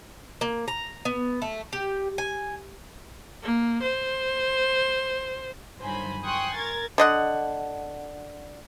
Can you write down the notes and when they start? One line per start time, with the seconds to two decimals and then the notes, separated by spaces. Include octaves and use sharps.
0.41 A#3
0.68 A#5
1.05 B3
1.42 A3
1.73 G4
2.18 G#5
3.43 A#3
3.82 C5
5.79 G1 D#3 F#3 C5 G#5 B5
6.24 G5 G#5 C6 C#6 D#6 F#6
6.55 A#4 G#6 A6
6.98 D3 D#5 F#5